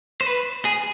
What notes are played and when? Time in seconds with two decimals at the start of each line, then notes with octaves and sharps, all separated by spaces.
0.21 C5
0.26 B4
0.65 G#4